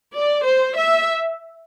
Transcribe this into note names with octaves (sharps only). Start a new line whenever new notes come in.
D5
C5
E5